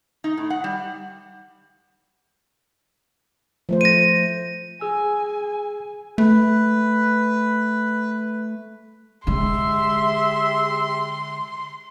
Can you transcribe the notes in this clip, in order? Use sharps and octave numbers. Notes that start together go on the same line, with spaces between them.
D#4
A2
F#5
G3
F3 A3 C5
A#6 D#7
G#4 G#5 E6
A3 B4
D3 G#3 G4 G#4 E5 C6